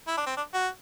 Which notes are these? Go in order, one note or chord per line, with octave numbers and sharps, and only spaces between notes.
E4
D4
C4
D4
F#4